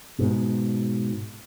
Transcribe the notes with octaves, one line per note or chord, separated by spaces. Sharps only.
G#2 B2